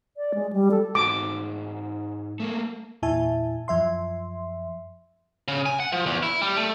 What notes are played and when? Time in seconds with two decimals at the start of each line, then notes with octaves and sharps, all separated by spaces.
0.17 D5
0.34 G#3
0.53 G3
0.71 A4
0.95 G#2 F#4 D6
2.40 A3 A#3
3.02 E2 A#2 E4 E5 G#5 A5
3.68 F#2 F3 E5 C6
5.48 C#3
5.66 G#5
5.80 F#5
5.92 F3
6.06 E2
6.23 E4
6.41 G3
6.57 A3